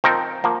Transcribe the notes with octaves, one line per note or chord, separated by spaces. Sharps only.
F3 C4 D#4 A#4
F3 A#3